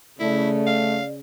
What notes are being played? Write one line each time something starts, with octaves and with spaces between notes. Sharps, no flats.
C#3 A3 E4 D5
F5